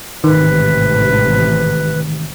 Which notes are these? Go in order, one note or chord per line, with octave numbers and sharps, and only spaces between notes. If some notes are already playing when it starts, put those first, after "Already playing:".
A1 G#2 C3 D#3 B4